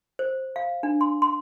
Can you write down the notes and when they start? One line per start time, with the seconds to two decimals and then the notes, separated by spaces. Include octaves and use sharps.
0.19 C5
0.56 F5
0.83 D4
1.01 C6
1.22 C6